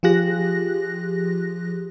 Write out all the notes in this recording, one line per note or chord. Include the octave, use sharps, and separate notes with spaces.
F3 F4 G4 G#4 F#6 A#6